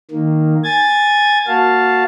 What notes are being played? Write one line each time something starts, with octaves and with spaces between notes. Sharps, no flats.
D#3 A#3
G#5 G#6 A6
A#3 F#4 F5 A5